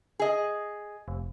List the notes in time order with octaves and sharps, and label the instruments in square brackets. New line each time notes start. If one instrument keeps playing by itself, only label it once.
[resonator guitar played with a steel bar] G#4 D#5
[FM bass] F1